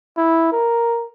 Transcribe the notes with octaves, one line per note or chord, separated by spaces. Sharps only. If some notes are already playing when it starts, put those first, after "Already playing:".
E4
A#4